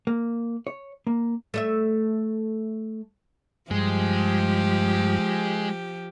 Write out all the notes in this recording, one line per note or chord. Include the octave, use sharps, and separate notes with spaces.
A#3
C#5
A#3
A3 D#5 E5
G2 F3 G#3 G4